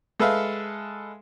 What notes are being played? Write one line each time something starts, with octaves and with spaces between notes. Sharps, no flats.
G#3 A4 B4 E5 F5